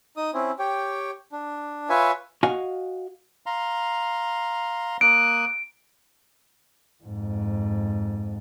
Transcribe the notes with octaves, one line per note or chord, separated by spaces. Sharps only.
D#4 D#6
C4 C#4 E4
G4 C#5 G5
D4
F4 B4 C#5 E5 G#5
F#4 D#5 F5 G#5
F5 A#5 C6
A#3 D#6 F#6 D7
F2 G#2